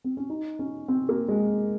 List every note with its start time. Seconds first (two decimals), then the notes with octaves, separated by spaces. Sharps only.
0.04 C4
0.17 C#4
0.30 D#4
0.59 C#4
0.88 C4
1.09 A#3
1.28 G#3